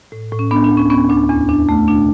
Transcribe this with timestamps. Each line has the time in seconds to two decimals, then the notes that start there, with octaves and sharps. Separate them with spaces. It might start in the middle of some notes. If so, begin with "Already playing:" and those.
0.12 A2
0.32 A2
0.39 C#4
0.51 B3 D4
0.64 D4
0.71 D2
0.77 C#4
0.90 B3 C#4
1.09 D2 D4
1.29 E2 C#4
1.49 E2 D4
1.69 A3
1.87 B2 D4